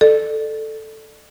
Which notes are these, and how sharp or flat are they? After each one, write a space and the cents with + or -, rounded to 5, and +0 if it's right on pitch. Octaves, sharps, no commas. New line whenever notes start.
A4 +0 D5 +35